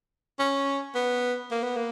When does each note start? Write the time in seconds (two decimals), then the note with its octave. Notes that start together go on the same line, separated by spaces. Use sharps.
0.39 C#4
0.95 B3
1.51 A#3
1.63 B3
1.76 A#3